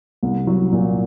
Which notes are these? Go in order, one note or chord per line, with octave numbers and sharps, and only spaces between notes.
C2
F#3
A#2